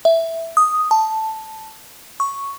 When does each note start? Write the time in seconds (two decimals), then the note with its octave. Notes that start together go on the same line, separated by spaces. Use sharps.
0.05 E5
0.57 D#6
0.91 A5
2.20 C#6